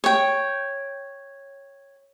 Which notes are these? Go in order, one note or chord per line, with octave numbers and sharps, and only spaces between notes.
C#5 G5